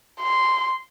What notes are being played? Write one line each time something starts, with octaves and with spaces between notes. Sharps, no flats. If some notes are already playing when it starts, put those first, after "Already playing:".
C6